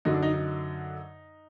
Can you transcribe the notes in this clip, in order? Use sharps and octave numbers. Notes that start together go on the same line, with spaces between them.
F#2 D3 F#3 D#4
D4
D#4
D#4